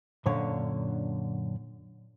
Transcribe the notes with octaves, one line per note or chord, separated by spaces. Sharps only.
F#2 A#2 D3 D4 C#5